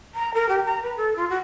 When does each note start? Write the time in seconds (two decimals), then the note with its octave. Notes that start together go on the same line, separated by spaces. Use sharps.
0.14 A#5
0.34 A#4
0.49 G4
0.66 A#5
0.82 B4
0.97 A4
1.16 F4
1.29 F#4